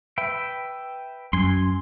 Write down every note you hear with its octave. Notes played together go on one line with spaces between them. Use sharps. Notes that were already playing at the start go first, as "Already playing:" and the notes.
B4 E5 G5
F#2 G#5 C6